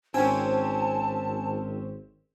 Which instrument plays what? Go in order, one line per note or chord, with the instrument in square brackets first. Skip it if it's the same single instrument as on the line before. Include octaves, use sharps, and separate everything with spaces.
[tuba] G#1 [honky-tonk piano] C4 C#4 [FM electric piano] G#5 [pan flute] A5